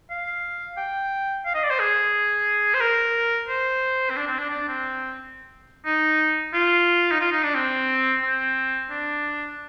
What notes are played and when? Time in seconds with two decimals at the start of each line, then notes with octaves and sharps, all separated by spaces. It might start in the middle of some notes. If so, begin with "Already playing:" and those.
0.10 F5
0.77 G5
1.46 F5
1.55 D#5
1.63 D5
1.71 C5
1.79 G#4
2.74 C5
2.81 A#4
3.48 C5
4.10 C4
4.17 D4
4.28 C4
4.39 D4
4.50 D4
4.68 C4
5.85 D#4
6.54 F4
7.12 D#4
7.21 F4
7.32 D#4
7.44 D4
7.55 C4
8.22 C4
8.90 D4